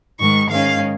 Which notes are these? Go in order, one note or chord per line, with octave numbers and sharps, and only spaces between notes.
G#2 D#3 G#3 C#6
G#2 D#3 G#3 C#4 F5